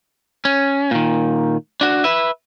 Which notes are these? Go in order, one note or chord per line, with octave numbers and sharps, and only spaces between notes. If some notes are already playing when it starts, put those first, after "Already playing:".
C#4
A#2 D#3
D4 F#4
B4 E5